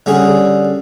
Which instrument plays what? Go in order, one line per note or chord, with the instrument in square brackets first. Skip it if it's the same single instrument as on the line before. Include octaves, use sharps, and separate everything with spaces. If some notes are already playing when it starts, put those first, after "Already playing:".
[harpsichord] D3 G3 C#4 G#4